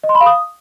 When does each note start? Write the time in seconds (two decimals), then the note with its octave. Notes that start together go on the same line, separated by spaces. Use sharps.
0.04 D#5
0.09 C6
0.15 B5
0.21 F5
0.26 D#6